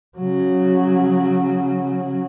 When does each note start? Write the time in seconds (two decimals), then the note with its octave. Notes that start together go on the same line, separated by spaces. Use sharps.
0.18 C#3 F#3